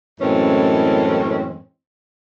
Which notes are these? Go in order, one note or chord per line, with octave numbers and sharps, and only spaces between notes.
F#2 A2 E3 G#3 C4 C#4